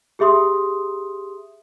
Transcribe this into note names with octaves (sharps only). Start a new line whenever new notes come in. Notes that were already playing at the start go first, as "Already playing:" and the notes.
G4 G#4 E5 C6 D#6